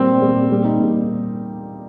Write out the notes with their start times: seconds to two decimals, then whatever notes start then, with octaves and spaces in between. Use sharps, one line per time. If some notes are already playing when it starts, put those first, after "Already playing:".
Already playing: A#2 G3 C4
0.21 A#2 G3
0.51 A#2 G3
0.65 D#4
0.79 A#2 G3